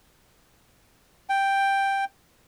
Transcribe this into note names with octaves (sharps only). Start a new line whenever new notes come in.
G5